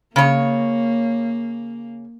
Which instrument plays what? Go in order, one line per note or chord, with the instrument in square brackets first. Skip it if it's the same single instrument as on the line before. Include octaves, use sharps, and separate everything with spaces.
[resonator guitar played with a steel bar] C#3 C#5 [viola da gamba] A#3